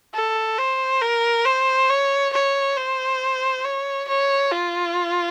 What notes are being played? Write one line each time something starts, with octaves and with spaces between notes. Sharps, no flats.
A4
C5
A#4
C5
C#5
C#5
C5
C#5
C#5
F4